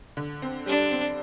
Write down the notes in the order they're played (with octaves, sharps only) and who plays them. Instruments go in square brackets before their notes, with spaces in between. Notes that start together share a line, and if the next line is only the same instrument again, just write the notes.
[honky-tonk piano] D3
C4
[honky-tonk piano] G3 [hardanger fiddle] D4
[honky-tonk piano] C4